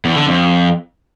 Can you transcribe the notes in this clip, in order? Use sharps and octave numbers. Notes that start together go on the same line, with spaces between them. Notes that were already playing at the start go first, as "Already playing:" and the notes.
E2
D3
F2